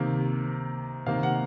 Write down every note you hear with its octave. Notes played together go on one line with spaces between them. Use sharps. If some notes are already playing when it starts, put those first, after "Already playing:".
Already playing: C3 D#3 A#3
C3 D#3 A#3 F5
F#5